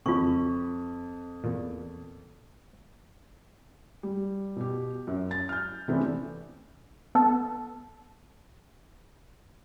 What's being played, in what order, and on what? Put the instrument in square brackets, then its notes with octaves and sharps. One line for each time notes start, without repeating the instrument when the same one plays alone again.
[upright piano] F2 [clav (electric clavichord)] C#3 [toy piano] F4 C#6
[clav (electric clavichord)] E2 A#2
[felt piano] G3
B2 G4
F#2
A6
F6 G6
C3 E3 A3 B3 C#4 D4
[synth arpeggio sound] B3 A4